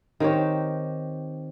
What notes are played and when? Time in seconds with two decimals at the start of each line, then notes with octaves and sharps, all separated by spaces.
0.20 D#3 C4 G4 C#5